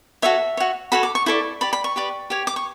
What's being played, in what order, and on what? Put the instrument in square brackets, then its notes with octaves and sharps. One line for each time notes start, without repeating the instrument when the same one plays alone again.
[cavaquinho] F#4 A4 C#5 E5
F#4 C#5
F#4 A4 C#5 B5
D6
C#6
E4 A4 D5 C#6
G4 D5 B5
B5
C#6
G4 B4 D5
G4 C#5
D6
C#6